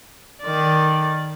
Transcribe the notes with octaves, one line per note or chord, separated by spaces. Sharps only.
D#3 D5